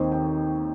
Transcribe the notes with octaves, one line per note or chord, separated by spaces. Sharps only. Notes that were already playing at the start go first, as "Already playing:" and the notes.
Already playing: D#2 D#3 C4 D#4 C5
G5